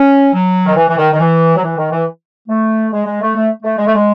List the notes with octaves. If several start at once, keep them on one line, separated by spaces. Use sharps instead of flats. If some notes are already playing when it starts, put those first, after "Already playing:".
Already playing: C#4
F#3
D#3
E3
E3
D#3
D#3
E3
F#3
E3
D#3
E3
A3
G#3
G#3
A3
A3
A3
G#3
A3
G#3